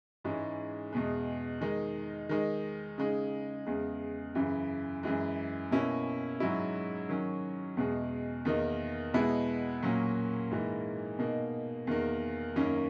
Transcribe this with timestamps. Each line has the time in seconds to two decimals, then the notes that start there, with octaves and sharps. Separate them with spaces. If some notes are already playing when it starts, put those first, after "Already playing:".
0.24 G#2 E3 G#3 C#4
0.93 E2 B2 G#3
1.61 D#3 G#3 D#4
2.29 D#3 G#3 D#4
2.98 C#3 G#3 D#4
3.66 E2 C#3 G#3
4.35 F#2 C#3 E3
5.03 F#2 E3 G#3
5.71 B2 A#3 C#4 E4
6.40 G#2 F#3 C#4 E4
7.09 D#3 F#3 C#4
7.77 E2 B2 G#3
8.45 E2 D#3 A#3 D#4
9.14 B2 G#3 B3 E4
9.82 A#2 F#3 A#3 C#4
10.51 G#2 E3 A#3
11.19 B2 A#3 D#4
11.87 E2 D#3 A#3
12.56 F#2 D#3 A#3 C#4